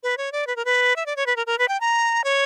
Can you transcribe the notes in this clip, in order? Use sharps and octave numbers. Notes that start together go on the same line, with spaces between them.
B4
C#5
D5
B4
A#4
B4
E5
D5
C#5
B4
A#4
A#4
B4
G5
A#5
C#5